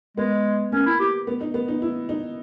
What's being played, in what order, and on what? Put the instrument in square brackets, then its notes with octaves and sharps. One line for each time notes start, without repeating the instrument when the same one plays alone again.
[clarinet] G#3 [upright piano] B3
[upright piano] A#3 [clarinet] C#4
[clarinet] E4
G4
[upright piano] B3
D#4
B3
D#4
E4
D#4